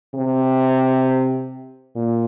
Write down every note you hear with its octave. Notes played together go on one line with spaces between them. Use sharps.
C3
A#2